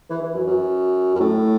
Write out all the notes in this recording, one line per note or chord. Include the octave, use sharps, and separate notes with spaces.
E3
E3
F#2
F#2
F#2
A2